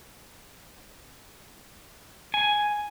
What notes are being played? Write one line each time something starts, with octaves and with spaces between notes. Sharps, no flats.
G#5